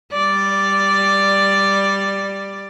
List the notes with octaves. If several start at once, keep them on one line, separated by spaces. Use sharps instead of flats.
G3 D5